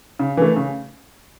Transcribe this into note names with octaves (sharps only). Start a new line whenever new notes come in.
C#3
E3 A3
C#3